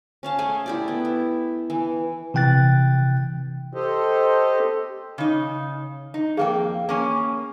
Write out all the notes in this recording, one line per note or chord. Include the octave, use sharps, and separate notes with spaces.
C#4 F5 A5
A3 G#4 G#5
E4 G4 D5
B3
E4
E3
C3 E3 G5 F#6 A6
G4 A4 C5 D#5
C#3 D#4
D#4
F2 A#3 G#4 F5 G5
A#3 C#4 G#5